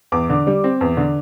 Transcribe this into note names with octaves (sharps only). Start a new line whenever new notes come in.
E2 D6
D3
G3
C4
E2
D3